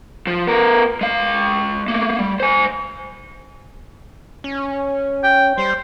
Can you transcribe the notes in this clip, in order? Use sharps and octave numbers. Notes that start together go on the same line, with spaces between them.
F3
B3 A#4
G#3 F5
A3 A#3
G3
C5 G#5
C#4
G5
G3 C5